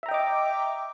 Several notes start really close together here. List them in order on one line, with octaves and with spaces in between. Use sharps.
E5 A#5 G5 D#5 D6